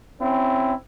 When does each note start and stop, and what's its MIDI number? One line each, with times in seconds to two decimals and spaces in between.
0.19 0.72 60
0.19 0.72 61
0.19 0.72 64